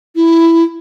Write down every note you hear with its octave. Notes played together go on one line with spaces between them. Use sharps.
E4